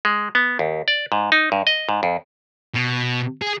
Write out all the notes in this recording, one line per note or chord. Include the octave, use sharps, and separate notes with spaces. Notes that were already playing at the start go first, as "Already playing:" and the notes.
G#3
B3
D#2
D5
G#2
D#4
G2
D#5
G#2
F2
B2
G#4